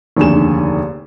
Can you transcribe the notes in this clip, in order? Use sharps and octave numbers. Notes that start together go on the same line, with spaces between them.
F1 D#2 D3 G#4 G#5 E7